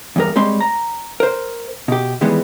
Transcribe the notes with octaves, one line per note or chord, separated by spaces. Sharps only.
E2 G2 A#4
G3 G#3 C4 C#5 C6
A#5
A#4 C5
B2 G4
D#3 E3 G3 G#3 B3